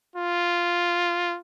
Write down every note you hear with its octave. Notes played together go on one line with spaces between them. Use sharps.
F4